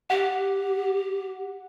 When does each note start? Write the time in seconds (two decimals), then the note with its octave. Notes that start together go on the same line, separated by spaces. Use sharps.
0.10 G4 F#5